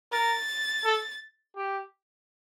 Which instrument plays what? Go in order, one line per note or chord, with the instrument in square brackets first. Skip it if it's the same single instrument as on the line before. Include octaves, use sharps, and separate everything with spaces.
[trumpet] A#4 [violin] A6
[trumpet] A4
G4